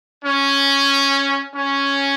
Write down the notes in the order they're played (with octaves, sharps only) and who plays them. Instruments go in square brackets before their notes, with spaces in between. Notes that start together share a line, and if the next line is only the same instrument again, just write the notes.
[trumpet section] C#4
C#4